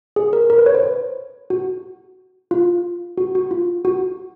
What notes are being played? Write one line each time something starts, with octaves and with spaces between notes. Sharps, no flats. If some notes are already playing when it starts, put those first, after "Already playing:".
G#4
A#4
A#4
B4
C#5
C5
B4
F#4
F4
F#4
F#4
F4
F#4